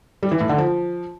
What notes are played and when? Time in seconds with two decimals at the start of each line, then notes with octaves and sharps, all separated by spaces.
0.23 G3
0.32 E3
0.40 A2
0.49 D3
0.58 F3